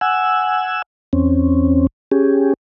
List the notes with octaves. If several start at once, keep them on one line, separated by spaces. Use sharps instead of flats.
F#5 G#5 E6
E2 C4 C#4
C#4 G4 G#4